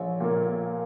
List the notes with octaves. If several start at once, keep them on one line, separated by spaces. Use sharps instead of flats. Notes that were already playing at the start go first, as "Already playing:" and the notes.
Already playing: A#1 C#5
A#2 A#3